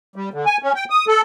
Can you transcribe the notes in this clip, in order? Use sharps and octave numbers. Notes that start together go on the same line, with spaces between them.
G3
D3
G#5
C#4
G5
D#6
A4